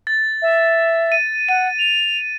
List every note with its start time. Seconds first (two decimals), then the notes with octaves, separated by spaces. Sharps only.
0.07 A6
0.42 E5
1.12 D#7
1.49 F#5 D#7
1.79 F7